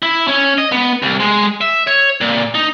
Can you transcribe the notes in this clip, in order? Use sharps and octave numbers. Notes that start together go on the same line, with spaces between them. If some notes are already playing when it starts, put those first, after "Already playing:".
E4
C#4
D#5
B3
C2
G#3
E5
C#5
A#2
D#4